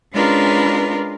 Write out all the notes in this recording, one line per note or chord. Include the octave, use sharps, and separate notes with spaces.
G#3 C#4 D4 F4 A#4 B4